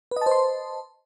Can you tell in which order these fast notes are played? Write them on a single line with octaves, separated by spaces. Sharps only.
B4 D#5 A5 C5 C6